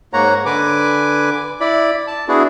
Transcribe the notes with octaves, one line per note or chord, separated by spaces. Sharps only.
G#2 A#3 C#5 F#5 A#5
D3 B4 G#5 D6
E4 D5 B5
A5
B3 D4 E4 F#4 G#4